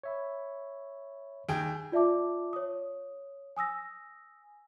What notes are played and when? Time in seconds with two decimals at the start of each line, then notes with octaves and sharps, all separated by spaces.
0.03 C#5 E5 B5
1.49 D#2 G#4 G5
1.92 F4 D5 E5 A5 D6
2.53 C#5 D#6
3.57 G#5 D#6 E6 A#6